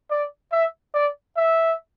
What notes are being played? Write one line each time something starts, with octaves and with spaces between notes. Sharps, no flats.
D5
E5
D5
E5